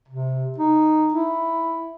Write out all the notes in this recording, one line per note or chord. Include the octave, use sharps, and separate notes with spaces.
C3
D#4
E4